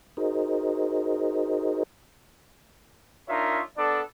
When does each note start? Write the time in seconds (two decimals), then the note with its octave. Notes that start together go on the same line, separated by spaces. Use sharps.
0.17 D#4 F#4 G#4 A#4 C5 D#5
3.29 D4 D#4 F4 A#4 C#5 E5
3.77 B3 D4 A4 D5